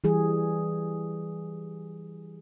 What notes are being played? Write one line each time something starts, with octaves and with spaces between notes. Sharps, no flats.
E3 G3 G#4